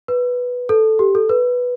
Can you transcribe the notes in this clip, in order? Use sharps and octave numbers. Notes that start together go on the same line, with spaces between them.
B4
A4
G4
A4
B4